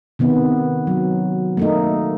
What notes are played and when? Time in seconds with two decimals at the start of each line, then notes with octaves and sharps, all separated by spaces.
0.19 C3 D#3 B3
0.87 F#3
1.57 A3 A#3 D#4